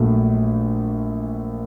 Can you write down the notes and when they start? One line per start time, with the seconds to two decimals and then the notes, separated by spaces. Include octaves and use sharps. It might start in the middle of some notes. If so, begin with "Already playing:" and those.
Already playing: A#1 A#2 F#3 A3